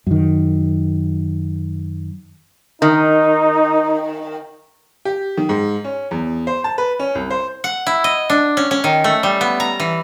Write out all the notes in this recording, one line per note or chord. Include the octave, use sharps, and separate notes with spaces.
F#2 D#3
D#3 D#4
G4
D#3
G#2
C#4
E2
C5
A5
B4
C#4
C2
C5
F#5
E4
D#5
D4
C#4
C#4
D#3
A3
G3
B3
A#5
E3